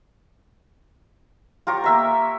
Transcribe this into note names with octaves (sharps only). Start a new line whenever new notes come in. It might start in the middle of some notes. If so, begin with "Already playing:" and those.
F4 G4 A#4 C#5
A#3 E5 A#5